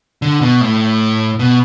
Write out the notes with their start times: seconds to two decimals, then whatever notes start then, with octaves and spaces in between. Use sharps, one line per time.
0.22 D3
0.41 B2
0.61 A2
1.39 B2